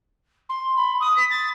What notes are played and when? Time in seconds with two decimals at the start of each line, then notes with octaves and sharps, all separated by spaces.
0.49 C6
0.76 B5
1.00 D#6
1.16 B6
1.30 A6